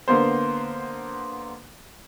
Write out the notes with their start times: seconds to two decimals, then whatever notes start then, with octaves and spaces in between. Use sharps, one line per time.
0.08 D3 A#3 B3 C5